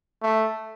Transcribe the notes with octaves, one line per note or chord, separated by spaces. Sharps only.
A3